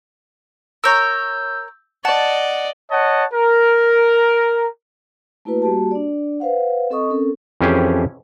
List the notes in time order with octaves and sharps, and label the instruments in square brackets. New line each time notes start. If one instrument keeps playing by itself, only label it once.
[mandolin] A#4 C#5 A#5 [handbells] E6 G6
[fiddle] D5 D#5 [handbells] F#5 [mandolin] A5
[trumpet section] C#5 D#5 F#5 A5
A#4
[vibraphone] A3 A#3 E4 F#4 B4
G3 A#3 F#4 G4 A5
D4 D5
B4 C5 F5 F#5
C4 A4 D#5 C#6 D#6
C4 C#4 A4 A#4
[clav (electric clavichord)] F2 E3 C#4 G4 G#4 C5